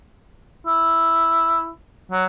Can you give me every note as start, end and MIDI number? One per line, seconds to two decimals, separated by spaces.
0.67 1.70 64
2.12 2.25 54